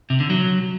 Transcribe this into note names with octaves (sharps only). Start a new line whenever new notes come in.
C3
D3
F#3